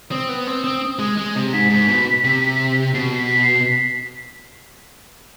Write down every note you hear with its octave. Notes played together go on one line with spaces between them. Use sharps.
C4 D#6
B3
C4
C4
G#3
G#3
C3
G#2 B6
G#2
B2
C3
B2 C7
B6
C7
B6